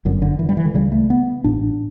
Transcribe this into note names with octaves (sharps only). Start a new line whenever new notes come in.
G1 F#2 D3
D3
E3
G3
E3
D3
C#2 C#3 G3
A3
B3
A1 A2 D4